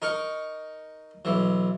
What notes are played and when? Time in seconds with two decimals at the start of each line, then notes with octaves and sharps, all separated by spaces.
0.02 D#4 A#4 C#6
1.25 B1 E3